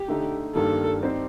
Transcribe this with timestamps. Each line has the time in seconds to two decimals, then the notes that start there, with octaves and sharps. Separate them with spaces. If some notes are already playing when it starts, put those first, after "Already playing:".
Already playing: G4
0.08 D3 A3 D#4
0.55 G2 D#3 G3 A#3 A4
1.01 G3 C4 D#4 G4 C5